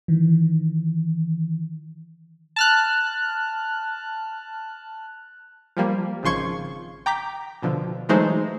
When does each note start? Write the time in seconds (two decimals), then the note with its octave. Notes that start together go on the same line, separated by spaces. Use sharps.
0.08 D#3 E3
2.56 A5 F6 F#6
5.77 F3 G3 A#3
6.23 G#1 C#3 F3 C6 C#6 G#6
7.06 G5 A#5 D6 G6 B6
7.62 B2 D3 F3
8.09 E3 F#3 G#3 A3 D#4 C5